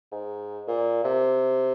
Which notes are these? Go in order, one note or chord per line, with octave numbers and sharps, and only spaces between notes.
G#2
A#2
C3